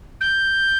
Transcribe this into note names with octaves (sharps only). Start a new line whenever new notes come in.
G6